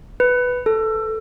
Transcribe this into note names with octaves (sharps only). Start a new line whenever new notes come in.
B4
A4